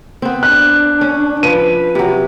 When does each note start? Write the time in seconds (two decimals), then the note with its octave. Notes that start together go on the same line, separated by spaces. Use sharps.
0.22 B3 C4
0.43 D4 B4 F#6
1.01 C#4
1.43 F3 B4 D#7
1.95 C3 F#3